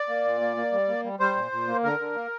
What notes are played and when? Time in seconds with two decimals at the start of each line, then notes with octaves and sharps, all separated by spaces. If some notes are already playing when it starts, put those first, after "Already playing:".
Already playing: D5
0.09 A#3
0.25 A#2
0.41 A#3
0.57 A#3
0.72 G3
0.89 A#3
1.04 G3
1.20 G3 C5
1.36 A#2
1.52 A#2
1.68 A#3
1.83 D3 A#4
1.99 D3
2.15 A#3